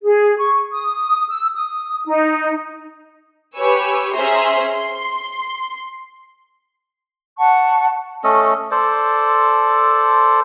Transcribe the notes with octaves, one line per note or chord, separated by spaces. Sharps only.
G#4
C#6
D#6
E6
D#6
D#4
G4 B4 C#5 G#5 C#6 E6
C#4 G#4 C5 E5 A#5 C6
C6
F#5 A5 C#6
A3 C#4 A4 D#5
A4 C5 D5